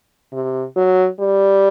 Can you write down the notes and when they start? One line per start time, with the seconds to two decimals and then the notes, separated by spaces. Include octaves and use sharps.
0.33 C3
0.76 F#3
1.20 G3